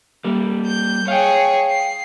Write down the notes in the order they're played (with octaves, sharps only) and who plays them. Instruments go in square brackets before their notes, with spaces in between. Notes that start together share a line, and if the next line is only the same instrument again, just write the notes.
[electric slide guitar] G3 A#3
[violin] G6
[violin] G#4 C#5 [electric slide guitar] F5 G5
[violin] C7